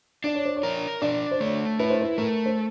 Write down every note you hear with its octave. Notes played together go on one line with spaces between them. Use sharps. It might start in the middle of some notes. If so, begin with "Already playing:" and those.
D4 D5
C#5
C5
C#5
A#4
D4 D5
C5
A3 C#5
E4 B4
C5
B4
A3 A#4
C5